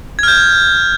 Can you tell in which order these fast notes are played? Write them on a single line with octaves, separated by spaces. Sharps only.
G#6 F6 G6